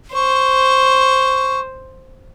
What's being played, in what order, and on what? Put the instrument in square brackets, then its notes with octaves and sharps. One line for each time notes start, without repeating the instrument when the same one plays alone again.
[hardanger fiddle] C5 [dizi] C#6